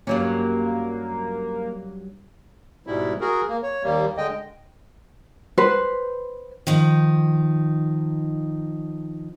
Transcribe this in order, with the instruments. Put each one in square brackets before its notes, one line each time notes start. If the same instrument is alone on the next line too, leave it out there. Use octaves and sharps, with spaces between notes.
[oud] G2 F#3 C#4 [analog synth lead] A#3
[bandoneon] G#2 B2 G3 E4
F#4 G#4 A#4
A#3
C#5
D#2 G3 A#3
D3 G#3 D#5 G5
[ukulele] B4 C5
[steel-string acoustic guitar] D#3 F3 D#4